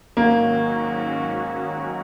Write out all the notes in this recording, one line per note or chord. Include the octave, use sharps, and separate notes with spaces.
G#2 D#3 F#3 A#3 C#4 F#4